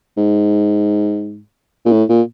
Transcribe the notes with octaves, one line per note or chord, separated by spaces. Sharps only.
G#2
A#2
A2
A#2